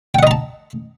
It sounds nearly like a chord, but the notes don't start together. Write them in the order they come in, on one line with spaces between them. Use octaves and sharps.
G5 F#5 D#5 A#5 A5